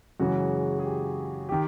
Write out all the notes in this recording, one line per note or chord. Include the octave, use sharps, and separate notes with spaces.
F#2 C#3 E3 G#3 F#4
G#4
G4
D#3 G4